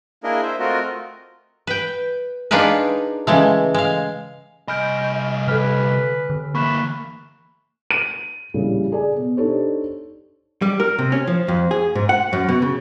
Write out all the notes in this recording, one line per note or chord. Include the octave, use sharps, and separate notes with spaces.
A#3 D4 E4 G#4 A#4 D#5
C5 E5
A3 C4 F4 F#4 A#4 D#5
B4 G5
D4 D#4 F4 G#4 A#4 B4
C#3 E3 G#3 A3
G#3 F5
C2 D#5 G#5 B5 F6 G6 D7
D3 A4 B4 B5 F6 B6
D3
E3 A#3 B5 C#6 F#6 E7
D#7
A#1 A2 C#3 G3
G#4 D5 G#5
B2
D4 D#4 G4 A4 C5 C#5
G3
A#4
C3
C#4
F3
F2
G#4
G#2
F#5
F#2
B2
C#3